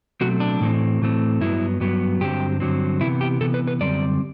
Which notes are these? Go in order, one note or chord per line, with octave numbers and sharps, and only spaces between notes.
B2 F#3 A3 C4 F#4
D4
A2 E3 A3 C4
A2 E3 A3 C4
G2 F#3 B3 E4
G2 F#3 B3
G2 D3 F#3 C4 G4
G2 D3 F#3 C4
C3 E3 B3 E4
G4
C3 E3 B3 A4
B4
B4
F#2 D3 G3 C4 D5